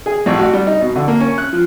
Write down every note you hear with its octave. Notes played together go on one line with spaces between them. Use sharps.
G#4
A1
F#4
G3
D#4
B2
D3
A#3
C#4
F#6
F3